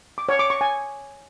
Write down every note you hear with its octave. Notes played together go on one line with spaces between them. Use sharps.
D6
C#5
D6
C#6
G#5